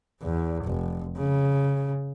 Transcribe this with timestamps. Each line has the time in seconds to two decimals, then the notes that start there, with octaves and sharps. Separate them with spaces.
0.22 E2
0.65 F1
1.18 C#3